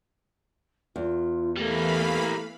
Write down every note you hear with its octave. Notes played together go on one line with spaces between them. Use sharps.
E2 F4
E3 G3 A3 A#3 F5 B5